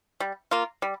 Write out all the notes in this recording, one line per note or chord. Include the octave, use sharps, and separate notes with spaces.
G3
A#3 F4
G3